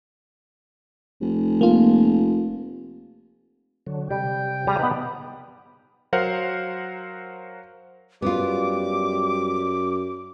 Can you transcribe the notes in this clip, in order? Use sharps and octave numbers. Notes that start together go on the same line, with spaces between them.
F1
A#3 F4
D3 F#3
C3 G3 G5
C3 G3 G#4 A#5
B3 D#4 B4
F#3 A#4 C5 F5 F#5
F#2 G3 B3 F4 D6